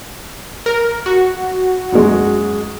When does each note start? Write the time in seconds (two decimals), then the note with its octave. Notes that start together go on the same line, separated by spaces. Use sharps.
0.66 A#4
1.06 F#4
1.92 F#2 F#3 G#3